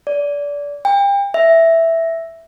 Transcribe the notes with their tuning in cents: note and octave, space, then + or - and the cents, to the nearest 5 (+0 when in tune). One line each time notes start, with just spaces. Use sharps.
D5 -25
G5 +35
E5 +0